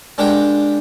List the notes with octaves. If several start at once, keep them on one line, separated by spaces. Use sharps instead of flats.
G#3 D4 G4 A#4 F#5 G5